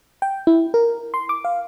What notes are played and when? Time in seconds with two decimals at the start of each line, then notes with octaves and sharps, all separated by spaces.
0.22 G5
0.47 E4
0.74 A#4
1.14 C6
1.29 D6
1.45 F5